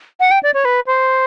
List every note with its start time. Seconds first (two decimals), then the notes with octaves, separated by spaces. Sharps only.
0.20 F#5
0.31 G5
0.43 D5
0.54 C#5
0.65 B4
0.87 C5